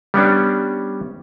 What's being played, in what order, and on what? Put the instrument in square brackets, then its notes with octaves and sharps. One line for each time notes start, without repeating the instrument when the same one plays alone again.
[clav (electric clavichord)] G3 B3 C#4 D4